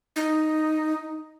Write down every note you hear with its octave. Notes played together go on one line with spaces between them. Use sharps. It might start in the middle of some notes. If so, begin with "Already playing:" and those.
D#4